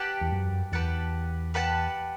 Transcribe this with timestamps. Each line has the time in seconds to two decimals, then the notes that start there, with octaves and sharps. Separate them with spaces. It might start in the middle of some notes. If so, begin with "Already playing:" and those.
Already playing: G4 B4 F#5 A5
0.21 E2
0.32 F#2
0.72 E2 G4 B4 F#5 A5
1.54 G4 B4 F#5 A5